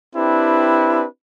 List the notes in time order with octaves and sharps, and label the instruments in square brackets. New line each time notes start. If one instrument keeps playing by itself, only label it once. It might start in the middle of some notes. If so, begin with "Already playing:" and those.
[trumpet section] C4 D4 E4 G4 B4